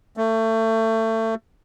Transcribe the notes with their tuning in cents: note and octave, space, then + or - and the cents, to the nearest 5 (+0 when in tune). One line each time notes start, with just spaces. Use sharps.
A3 +25